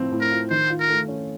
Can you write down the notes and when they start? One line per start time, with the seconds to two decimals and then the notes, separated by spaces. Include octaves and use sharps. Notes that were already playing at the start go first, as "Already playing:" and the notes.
Already playing: A2 F3 C4
0.12 A2
0.21 A#4
0.31 F4
0.50 D#3 C5
0.70 F4
0.80 A#4
0.89 A3
1.08 C#4